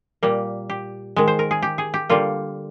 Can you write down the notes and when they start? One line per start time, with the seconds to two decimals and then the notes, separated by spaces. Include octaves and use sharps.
0.23 A#2 G3 A#3
0.70 G4
1.16 D#3 G#3
1.28 C5
1.39 A#4
1.51 G#4
1.62 G4
1.78 G#4
1.94 G4
2.09 D3 G3 A#3 F4